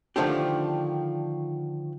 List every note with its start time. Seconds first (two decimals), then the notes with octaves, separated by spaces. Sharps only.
0.16 D3 D#3 F3 A3 D4 G4